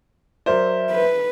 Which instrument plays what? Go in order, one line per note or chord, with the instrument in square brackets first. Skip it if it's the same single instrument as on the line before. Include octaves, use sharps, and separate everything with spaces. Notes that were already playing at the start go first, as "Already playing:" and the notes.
[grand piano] F#3 A#4 D5 [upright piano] C5 [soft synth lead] E5
[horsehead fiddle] B4